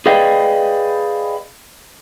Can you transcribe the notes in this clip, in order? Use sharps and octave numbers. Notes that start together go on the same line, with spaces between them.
G#4 B4 D5 D#5 F5 G5